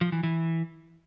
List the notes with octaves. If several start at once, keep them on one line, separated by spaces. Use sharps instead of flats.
F3
E3
E3